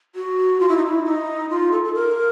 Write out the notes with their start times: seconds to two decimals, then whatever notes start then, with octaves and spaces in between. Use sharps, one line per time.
0.15 F#4
0.60 F4
0.69 E4
0.77 D#4
0.85 E4
1.05 D#4
1.49 F4
1.72 A4
1.84 A4
1.94 A#4